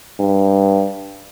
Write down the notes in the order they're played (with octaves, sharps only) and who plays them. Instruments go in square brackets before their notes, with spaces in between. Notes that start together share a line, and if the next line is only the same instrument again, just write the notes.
[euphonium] G2